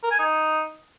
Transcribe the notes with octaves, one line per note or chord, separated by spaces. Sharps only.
A#4
G#5
D#4